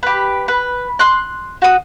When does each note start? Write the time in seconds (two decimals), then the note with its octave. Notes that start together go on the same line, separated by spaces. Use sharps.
0.03 G4 B4
0.48 B4
0.99 C6 F#6
1.62 F#4 D#6